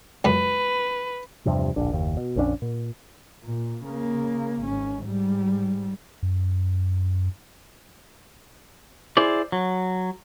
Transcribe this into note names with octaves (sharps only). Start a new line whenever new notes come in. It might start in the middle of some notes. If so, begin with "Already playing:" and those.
C#2 F#2 B4
E2 G2 C3 F3
D1 A#1 D4
F#1 D#2
B2
A#1 F2 C#4 D4
A#2
A#2
C#3 A#3
G#1 C#4
G#2 G3
F#2
E4 G#4 C5 D5
F#3